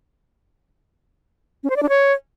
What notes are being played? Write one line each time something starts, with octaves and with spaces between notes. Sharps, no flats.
C#4
C5
D5
D4
C#5